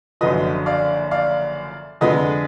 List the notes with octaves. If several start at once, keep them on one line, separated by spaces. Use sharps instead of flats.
F#1 F#2 D3 F3 B4 D#5
D5 F5
D5 F5
F2 D3 F3 G#3 B4 D#5